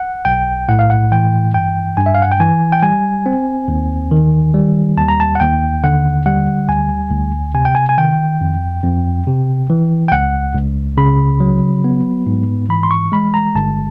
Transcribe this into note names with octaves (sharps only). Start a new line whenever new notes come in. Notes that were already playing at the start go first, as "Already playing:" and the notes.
Already playing: F#5
B1 G5
A2 F#5
F5
F#5
E3 G5
G2 G5
G2 G#5
E5
F5
F#5
G5
E3 G#5
G5
G3 G#5
C4
D#2
D#3
G3
D#2 A5
A#5
A5
F#5
D#2 G5
D3 F#5
G3 F#5
D2 G#5
D2
C3 G#5
G5
G#5
G#5
D#3 G5
F2
F2
C3
E3
G5
C#2 F#5
C#2
C#3 B5
F#3
B3
G#2
E3 B5
C6
C#6
G#3 B5
A#5
G1 A5